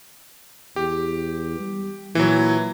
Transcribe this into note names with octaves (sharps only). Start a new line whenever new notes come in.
E2 G4
G3
A#2 E3 F#3